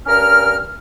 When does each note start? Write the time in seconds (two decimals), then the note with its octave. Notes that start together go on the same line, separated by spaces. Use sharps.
0.07 G2 C#4 A#4 A#5 F6